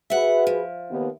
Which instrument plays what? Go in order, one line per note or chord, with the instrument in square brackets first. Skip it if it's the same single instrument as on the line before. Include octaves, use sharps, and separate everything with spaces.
[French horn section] F#4 G#4 B4 [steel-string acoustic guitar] E5 F#5
[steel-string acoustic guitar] F3
[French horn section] D#2 B3